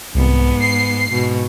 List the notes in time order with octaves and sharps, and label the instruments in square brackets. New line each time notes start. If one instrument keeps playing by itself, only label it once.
[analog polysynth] C2 [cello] G#2 B3
[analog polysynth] C7
[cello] G#2 B2